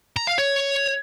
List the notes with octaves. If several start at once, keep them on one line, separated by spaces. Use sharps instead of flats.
A#5
F5
C#5